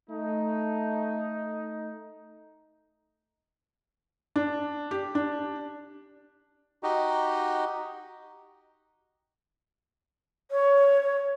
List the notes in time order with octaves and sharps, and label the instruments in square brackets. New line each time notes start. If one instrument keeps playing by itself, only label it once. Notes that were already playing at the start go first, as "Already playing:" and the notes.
[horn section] A3 D#4
[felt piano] D4
G4
D4
[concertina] D#4 F#4 G4 D#5
[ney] C#5